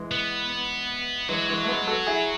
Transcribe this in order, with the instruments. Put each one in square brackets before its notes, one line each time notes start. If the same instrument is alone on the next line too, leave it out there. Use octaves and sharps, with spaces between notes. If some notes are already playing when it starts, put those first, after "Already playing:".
Already playing: [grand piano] E3 G#3
[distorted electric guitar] B3
[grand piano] E3 G#3 [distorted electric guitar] F#3
[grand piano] E3 G#3
A3
G#3 B3
F#4 A4
E4 G#4